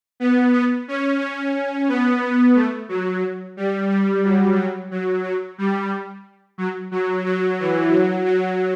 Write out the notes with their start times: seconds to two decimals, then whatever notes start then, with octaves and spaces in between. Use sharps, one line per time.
0.20 B3
0.54 B3
0.88 C#4
1.20 C#4
1.88 B3
2.55 A3
2.89 F#3
3.57 G3
3.90 G3
4.24 F#3
4.57 F#3
4.91 F#3
5.24 F#3
5.58 G3
6.58 F#3
6.91 F#3
7.26 F#3
7.59 E3
7.93 F#3
8.26 F#3